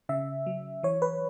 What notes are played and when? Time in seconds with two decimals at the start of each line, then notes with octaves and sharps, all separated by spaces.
0.09 C#3 E5
0.46 F#3
0.83 E3 C#5
1.02 B4